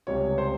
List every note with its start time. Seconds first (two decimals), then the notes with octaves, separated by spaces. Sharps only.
0.07 C#2 C3 G3 C#5
0.38 C5